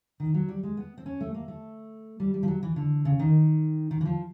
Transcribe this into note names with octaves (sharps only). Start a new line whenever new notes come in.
D#3
F#3
G3
G#3
B3
C4
C#4
A3
A#3
A3
G3
G3
F3
F#3
E3
D3
C#3
D#3
D#3
E3
F3